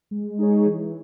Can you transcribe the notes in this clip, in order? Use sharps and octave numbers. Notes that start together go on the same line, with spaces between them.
G#3
D#4 G#4 C#5
E3